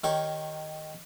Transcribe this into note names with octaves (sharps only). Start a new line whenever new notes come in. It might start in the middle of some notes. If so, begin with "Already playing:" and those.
D#3 G4 C#5